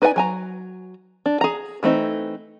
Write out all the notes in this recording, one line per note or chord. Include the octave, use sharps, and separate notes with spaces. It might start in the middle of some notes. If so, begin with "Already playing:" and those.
D#4 B4 D5 F#5 G#5
F#3 G#5 A#5
D4
G#4 A#5
E3 A3 C4 D#4